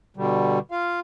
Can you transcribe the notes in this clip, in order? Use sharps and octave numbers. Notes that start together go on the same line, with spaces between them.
B2 D3 G3
F4 F5